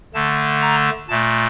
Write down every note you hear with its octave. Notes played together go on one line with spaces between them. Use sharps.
D3 A3 A5
A#5
A#2 A3 A5